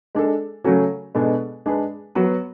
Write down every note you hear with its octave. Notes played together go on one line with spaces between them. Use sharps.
G#3 D4 A4
C#3 F#3 A3 C#4 F#4
B2 G#3 B3 D4 A4
G#3 D4 G#4 B4
F#3 B3 F#4 B4